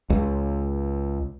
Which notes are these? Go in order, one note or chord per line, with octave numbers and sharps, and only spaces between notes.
C#2